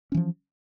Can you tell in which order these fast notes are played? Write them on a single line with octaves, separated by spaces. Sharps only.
C#4 E3 F3